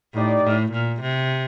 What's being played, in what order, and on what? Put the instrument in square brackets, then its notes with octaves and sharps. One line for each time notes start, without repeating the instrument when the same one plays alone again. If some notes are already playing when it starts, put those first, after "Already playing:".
[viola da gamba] A2 [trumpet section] D#4 G4 D5
[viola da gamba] A2
A#2
C3